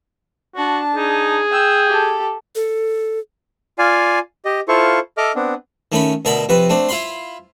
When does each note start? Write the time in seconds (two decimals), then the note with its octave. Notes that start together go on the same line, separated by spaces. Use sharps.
0.56 D4 F#4 A5
0.95 D#4 G#4
1.52 G5 E6
1.87 G4 A4
2.55 A4
3.79 F4 D5 F5 G#5
4.45 G4 D#5
4.68 E4 F4 A4 C5 F5 C#6
5.17 A4 D#5 E5 D6 F6
5.35 B3 C4 D4
5.92 D#3 A3 C#4 B5
6.25 D2 B2 A#4 E5 A5 B5
6.49 F2 C3 B4
6.70 A3 C4 D4
6.89 E4 F4 F5 B5 C6